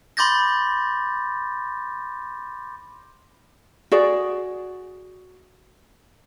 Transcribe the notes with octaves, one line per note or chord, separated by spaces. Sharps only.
B5 C6 D6 G6 A6 A#6
F#4 G#4 D5